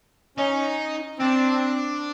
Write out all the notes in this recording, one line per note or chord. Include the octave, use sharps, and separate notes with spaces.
C#4 D#4
C4 D4